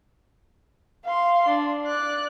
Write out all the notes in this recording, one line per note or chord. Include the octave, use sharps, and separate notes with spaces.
F5 C6
D4
D5 F#6